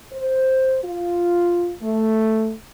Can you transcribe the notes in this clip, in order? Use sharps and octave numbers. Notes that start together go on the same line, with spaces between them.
C5
F4
A3